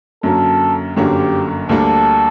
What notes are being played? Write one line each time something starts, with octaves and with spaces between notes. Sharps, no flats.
F#2 D3 F#3 A#3 A4
G1 F#2 D3 F#3 A#3 G4
D2 D3 G3 A#3 D4 A4